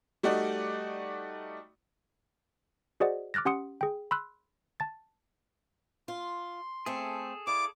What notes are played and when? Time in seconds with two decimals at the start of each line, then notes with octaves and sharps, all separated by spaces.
0.23 G3 A3 D#4 F#4 D5 D#5
3.00 F#4 G#4 C5 D5 D#5 F#5
3.34 D6 F6 F#6 A6 A#6
3.45 C#4 G4 F#5 C6 D#6 C#7
3.81 G#4 G5
4.11 B5 C6 E6 F#6
4.80 A5 A6
6.08 F4 C6
6.86 A3 C4 G#4 A4
7.47 E4 D5 F5 D6